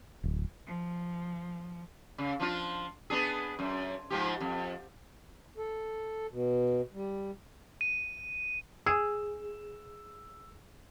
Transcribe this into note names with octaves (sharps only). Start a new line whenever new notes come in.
D1
F3
C#3
F3 D4 F4
B3 D4 G#4
F#2
G#2 F3 G4
F2
A4
B2
G3
D#7
G#4 E6